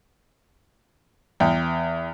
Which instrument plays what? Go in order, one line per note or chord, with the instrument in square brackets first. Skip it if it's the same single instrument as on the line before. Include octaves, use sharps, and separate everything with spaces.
[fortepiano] E2 G5